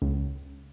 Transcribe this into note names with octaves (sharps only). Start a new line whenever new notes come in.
C#2